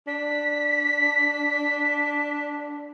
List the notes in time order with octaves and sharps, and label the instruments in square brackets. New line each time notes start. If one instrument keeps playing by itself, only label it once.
[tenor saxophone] D4 [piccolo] B6